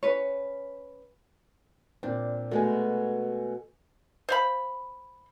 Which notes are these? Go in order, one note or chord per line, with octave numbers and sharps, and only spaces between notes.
C#4 B4 C#5
A#2 C4 D4
B2 G#3 A3 G#5
C5 F5 B5